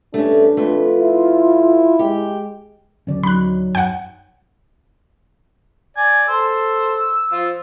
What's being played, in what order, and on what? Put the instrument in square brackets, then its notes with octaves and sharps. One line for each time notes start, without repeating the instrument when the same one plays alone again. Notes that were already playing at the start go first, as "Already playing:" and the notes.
[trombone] G2 [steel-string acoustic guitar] A3 C#4 [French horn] D4
[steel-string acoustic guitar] F2 A3 B4 [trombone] F4
[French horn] E4
[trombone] G#3 [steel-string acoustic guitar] G4
[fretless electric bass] D1 D3 C#4 [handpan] F#3 D5
[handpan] F#3 D#4 [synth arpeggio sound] B5 F#6
[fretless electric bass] F#2 [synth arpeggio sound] F#5 G5
[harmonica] D5 [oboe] G#5
[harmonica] A4 C5 [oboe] E6
[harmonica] F3 F4 C5